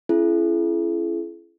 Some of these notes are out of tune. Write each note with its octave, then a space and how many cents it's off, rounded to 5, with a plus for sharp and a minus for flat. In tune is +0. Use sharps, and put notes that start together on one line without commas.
C#4 -10 E4 +40 G#4 +40